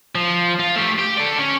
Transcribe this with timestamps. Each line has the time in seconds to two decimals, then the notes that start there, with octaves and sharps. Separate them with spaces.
0.15 F3
0.59 F4
0.76 A3 G4
0.99 G4
1.17 A4 D5
1.38 C#4 C#5